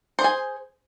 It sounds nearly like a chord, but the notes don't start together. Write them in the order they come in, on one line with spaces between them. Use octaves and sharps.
C5 G#4 G#5